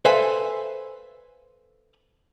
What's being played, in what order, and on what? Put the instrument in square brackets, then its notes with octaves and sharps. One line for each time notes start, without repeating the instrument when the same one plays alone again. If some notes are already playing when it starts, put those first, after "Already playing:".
[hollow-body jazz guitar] A4 B4 C5 E5 F5 G#5